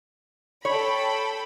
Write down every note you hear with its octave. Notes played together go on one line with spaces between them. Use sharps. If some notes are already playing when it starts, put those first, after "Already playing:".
A4 C#5 G5 B5